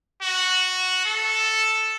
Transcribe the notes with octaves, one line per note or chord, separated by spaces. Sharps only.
F#4
A4